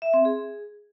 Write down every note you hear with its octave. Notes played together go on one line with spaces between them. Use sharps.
E5
C4
G#4